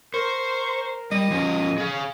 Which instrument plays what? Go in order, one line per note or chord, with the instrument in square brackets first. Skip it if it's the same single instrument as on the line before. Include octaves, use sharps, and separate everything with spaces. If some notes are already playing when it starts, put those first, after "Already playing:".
[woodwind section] A#4 [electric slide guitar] C5 [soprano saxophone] C#6
[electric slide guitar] G3 [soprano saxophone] D#5
[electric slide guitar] F3 C#4
G#4 F5